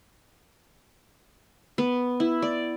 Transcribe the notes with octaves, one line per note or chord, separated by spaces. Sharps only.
B3
E4
D5